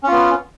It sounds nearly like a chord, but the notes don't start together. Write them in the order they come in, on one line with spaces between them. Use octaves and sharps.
C#4 F4 B3